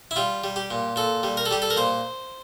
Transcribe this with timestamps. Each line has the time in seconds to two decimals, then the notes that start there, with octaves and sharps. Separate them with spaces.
0.11 E4
0.16 G3 F4
0.44 G3
0.56 G4
0.71 A#2
0.96 A#2 A4
1.23 G3
1.37 A#4
1.46 A4
1.51 G3 G4
1.62 A4
1.70 A#4
1.77 A#2 C5